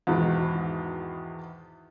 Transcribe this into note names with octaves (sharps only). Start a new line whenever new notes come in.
E2 G#2 B2 D#3